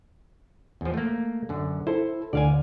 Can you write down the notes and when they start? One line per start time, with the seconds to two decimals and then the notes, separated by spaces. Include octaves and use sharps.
0.81 E2 F3
0.94 A3 A#3
1.49 F#2 D3
1.87 E4 A4 C5
2.33 D2 D3 D5 F5 G#5